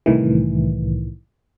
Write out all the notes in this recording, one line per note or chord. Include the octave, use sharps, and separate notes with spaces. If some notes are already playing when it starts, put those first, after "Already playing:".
C2 A2 D#3 E3